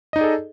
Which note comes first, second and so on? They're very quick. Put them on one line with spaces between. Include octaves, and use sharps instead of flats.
D#5 D#4 D5 G#4 A4